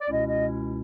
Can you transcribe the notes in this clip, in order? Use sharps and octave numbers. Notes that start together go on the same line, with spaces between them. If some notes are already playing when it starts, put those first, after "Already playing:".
D5
C#2 B2 G#3 C#4 E4 D#5
D#5